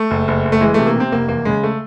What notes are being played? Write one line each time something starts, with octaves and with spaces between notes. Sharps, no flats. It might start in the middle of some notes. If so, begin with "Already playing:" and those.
Already playing: A3
F#1
F#1
F#1
A3
E3 G#3
C3 A3
A#3
C3 C4
F1 A#3
E2 A#3
C#3 G#3
A3